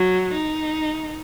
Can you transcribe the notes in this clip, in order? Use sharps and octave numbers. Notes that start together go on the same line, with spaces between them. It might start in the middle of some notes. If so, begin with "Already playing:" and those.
Already playing: F#3
D#4